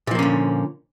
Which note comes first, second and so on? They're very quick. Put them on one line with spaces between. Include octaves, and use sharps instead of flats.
A#2 F3 A#3 C#4 D3